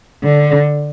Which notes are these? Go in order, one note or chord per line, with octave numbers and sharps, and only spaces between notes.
D3